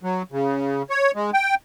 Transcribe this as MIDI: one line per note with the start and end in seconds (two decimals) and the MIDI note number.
0.03 0.22 54
0.32 0.82 49
0.90 1.11 73
1.15 1.30 56
1.34 1.55 79